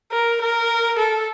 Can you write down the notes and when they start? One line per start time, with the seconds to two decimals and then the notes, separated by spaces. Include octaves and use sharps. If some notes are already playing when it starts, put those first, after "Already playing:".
0.12 A#4
0.41 A#4
0.99 A4